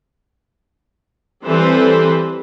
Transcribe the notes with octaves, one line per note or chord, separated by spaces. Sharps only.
E3 G3 C4 A4 B4 C5